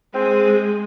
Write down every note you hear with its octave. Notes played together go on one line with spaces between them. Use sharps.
G#3 C4